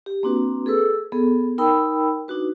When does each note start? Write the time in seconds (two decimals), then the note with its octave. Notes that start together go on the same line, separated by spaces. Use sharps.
0.06 G4
0.23 A#3 C4 D4 F#4 B4
0.66 G#4 A4 B4 E6
1.12 B3 G#4 A4
1.58 D#4 A#4 G5 B5 E6
2.28 D4 D#4 F#4 B4